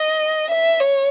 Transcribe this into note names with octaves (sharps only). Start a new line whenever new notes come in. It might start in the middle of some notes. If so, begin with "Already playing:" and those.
Already playing: D#5
E5
C#5